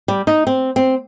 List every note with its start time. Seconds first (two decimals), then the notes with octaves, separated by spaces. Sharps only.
0.08 G3
0.27 D#4
0.47 C4
0.76 C4